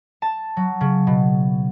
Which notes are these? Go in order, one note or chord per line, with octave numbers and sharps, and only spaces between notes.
A5
F#3
C#3
B2